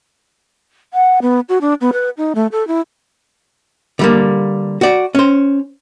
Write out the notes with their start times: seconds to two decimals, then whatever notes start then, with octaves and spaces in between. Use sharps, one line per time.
0.94 F#5
1.22 B3
1.49 F#4
1.61 D4
1.81 B3
1.93 B4
2.17 D#4
2.35 A3
2.52 A4
2.68 E4
3.99 D3 G3 A#3
4.81 F#4 D5
5.15 C#4 C5